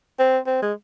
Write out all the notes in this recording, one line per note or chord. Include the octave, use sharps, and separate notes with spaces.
C4
C4
G#3